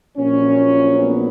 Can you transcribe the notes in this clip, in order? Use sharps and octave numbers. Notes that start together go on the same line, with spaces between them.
A#1 A#2 F#3 C#4
B3